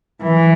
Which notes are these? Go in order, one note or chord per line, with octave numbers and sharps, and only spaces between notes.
E3